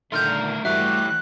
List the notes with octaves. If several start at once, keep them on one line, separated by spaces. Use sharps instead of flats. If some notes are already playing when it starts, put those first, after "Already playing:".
A#2 D3 D#3 A3 A#4 C6 F6 G6
E3 G3 A3 F#4 G4 E5 F#6